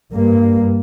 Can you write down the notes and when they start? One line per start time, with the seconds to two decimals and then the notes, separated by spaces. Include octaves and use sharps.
0.12 G2 A#3